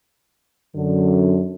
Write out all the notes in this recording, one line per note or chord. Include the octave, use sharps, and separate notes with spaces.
F#2 D3